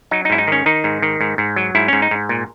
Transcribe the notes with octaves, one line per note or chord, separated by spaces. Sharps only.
F#3 D#4
D#4
G#2 E4
D#4
D#3 C#4
D#3 D#4
G#2
D#3
G#2
G#2
F#3
G#2 E4
G#2 C#4
D#4
G#2
A#2